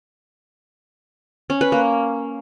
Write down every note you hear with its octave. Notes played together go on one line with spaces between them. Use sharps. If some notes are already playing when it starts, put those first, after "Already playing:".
C#4
B4
A#3